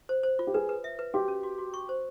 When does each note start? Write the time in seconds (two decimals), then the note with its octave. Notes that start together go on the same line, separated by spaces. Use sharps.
0.09 C5
0.23 C5
0.39 F4
0.47 G4
0.54 G#4 B4
0.69 B4
0.84 E5
0.99 B4
1.14 F#4 G4
1.28 C#4
1.43 F#4
1.58 F#4
1.74 C#6
1.89 C5